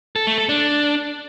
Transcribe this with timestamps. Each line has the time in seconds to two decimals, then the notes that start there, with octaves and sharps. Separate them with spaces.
0.16 A4
0.27 A3
0.38 A4
0.49 D4